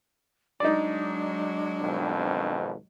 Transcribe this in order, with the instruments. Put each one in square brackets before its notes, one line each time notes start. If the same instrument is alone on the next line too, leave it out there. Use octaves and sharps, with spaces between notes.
[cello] F#3 G#3 [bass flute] D4 [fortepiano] D#4 D5
[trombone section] G#1 F2 B2